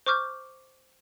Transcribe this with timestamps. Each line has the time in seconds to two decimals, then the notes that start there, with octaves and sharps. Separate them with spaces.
0.06 C5 C#6 D6 F6 G6